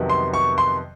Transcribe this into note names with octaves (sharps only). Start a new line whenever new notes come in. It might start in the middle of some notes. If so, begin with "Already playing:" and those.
Already playing: F2 C3 D#3 F#3 B3
C6
C#6
C6